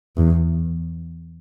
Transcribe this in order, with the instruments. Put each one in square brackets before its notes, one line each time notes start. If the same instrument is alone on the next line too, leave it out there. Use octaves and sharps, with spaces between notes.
[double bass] E2